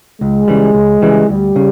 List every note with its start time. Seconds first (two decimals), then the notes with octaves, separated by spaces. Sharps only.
0.21 C#2 G#3
0.48 C#3 E3 G3
0.75 C#2
1.02 C#3 E3 G3
1.29 D2 G3
1.56 C#3